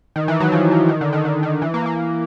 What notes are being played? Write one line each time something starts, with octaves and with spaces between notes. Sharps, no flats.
D#3
E3
F#3
F3
F3
D#3
D3
D#3
D3
D#3
E3
A#3
A#3